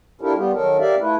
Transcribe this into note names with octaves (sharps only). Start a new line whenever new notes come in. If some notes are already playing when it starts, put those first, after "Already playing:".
D4 E4 F4 G4 A4 A#4
G3 B3 F4 G4
D#3 F#3 A4 A#4
G4 A#4 D5 E5 F5
A3 E4 F4 B4